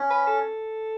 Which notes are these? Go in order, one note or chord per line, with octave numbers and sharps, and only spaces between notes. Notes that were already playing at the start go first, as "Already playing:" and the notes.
Already playing: C#4
B4
A4